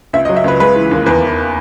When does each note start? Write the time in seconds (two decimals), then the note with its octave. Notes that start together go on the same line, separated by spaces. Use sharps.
0.13 C#2 E5
0.25 D#5
0.29 F#3
0.36 E5
0.44 C#2 B4
0.60 G#3 B4
0.76 E3
0.91 D#2
1.06 E2 B4
1.22 E3